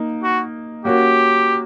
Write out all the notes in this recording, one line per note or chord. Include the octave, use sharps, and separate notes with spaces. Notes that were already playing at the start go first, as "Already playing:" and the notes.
Already playing: A#3 D#4
F#4
A#3 C#4 F#4 G4